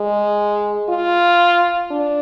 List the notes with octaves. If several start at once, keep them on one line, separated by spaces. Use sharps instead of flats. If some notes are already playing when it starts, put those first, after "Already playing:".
Already playing: G#3
F4
D4